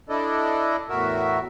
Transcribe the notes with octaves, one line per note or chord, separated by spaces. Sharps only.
D4 E4 A4 D5 D#5
E2 A2 F#4 A#4 E5